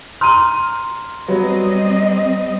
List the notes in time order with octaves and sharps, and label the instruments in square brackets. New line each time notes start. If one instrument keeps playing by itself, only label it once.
[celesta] A#5 C6 [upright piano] F6 D#7
[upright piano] F#3 B3 [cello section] G3 C4 D#5